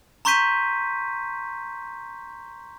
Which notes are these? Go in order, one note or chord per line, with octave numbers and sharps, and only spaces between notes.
A#5 C6 C#6 G6 B6 D#7